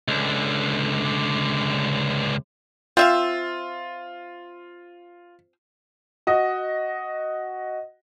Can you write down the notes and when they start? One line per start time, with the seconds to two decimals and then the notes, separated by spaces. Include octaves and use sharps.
0.08 C#2 D3
2.97 C4 F4 E5 F5
6.27 F#4 D#5